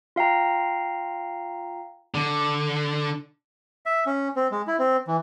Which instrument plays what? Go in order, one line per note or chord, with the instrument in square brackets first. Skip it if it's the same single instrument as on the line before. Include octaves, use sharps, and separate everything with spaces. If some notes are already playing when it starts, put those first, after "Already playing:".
[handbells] F4 F5 G5 A#5
[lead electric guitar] D3
[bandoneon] E5
C#4
C4
G#3
E4
C4
E3